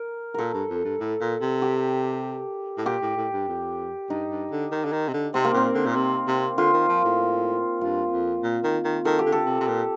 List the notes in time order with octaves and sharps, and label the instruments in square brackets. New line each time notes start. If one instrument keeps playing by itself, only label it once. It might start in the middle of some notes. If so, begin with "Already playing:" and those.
Already playing: [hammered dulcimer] A#4
[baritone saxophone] A#2 [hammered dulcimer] A4 A#4
[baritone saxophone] G2
F2
G2
A2
A#2
C3
[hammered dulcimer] G4
[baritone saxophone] A2
[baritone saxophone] A#2 [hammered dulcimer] G4
[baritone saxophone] A2
A2
G2
F2
[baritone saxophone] G2 [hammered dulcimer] D#4
[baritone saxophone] G2
D3
D#3
D3
D#3
C3
D3
[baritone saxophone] C3 [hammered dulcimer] C4
[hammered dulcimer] A#3
[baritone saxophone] A#2 [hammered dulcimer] C4
[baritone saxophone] D3
A#2
C3
C3
[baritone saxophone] D3 [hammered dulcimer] F4
[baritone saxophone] D#3
F3
A2
[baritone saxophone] G2 [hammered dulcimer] F4
[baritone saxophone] F2
A#2
D#3
D#3
[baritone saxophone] D#3 [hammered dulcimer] A4
[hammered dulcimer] G4
[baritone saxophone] D3
[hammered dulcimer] A4
[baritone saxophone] C3
C3
A#2